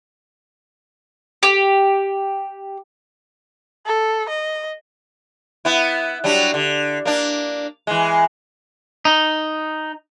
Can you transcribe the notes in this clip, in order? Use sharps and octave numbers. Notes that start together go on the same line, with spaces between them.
G4
A4
D#5
B3 E4
F#3 G3 D4
D3
A#3 D4
E3 G#3
D#4